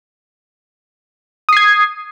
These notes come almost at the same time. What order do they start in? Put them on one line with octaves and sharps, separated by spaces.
D#6 C7 G#6